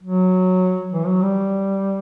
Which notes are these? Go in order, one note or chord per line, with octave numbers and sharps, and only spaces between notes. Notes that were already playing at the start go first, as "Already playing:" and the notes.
F#3
E3
F#3
G3